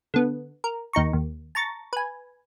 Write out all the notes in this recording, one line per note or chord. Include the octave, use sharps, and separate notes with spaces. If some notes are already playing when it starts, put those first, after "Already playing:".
D3 B3
A#4
D#2 D#4 A#5 C#6
D#2
A5 A#5 C#6 A6
B4 G#5